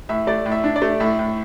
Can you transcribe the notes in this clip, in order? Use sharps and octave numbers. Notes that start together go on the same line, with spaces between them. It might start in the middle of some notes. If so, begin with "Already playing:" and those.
A2 E5
A3 D5
A2
E5
D4
D5
A3
A2 E5
A2